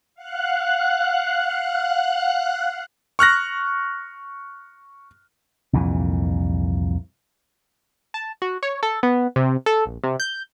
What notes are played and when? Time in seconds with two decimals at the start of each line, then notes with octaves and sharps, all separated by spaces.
0.15 F5 F#5 F#6
3.19 C#6 F6 F#6 A#6
5.73 C2 F2 A#2 E3
8.14 A5
8.42 F#4
8.63 C#5
8.83 A4
9.03 B3
9.36 C3
9.66 A4
9.86 A#1
10.04 C3
10.20 G6